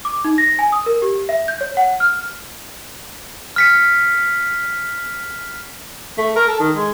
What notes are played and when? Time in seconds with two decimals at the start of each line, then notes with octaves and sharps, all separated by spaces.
0.05 D6
0.24 D#4
0.38 A#6
0.59 G#5
0.72 D#6
0.86 A#4
1.02 G4
1.29 E5
1.48 G6
1.61 C#5
1.77 F#5
2.00 F6
3.56 F6 B6 C#7
6.18 A3
6.36 A#4
6.48 A4
6.59 D#3
6.76 G#3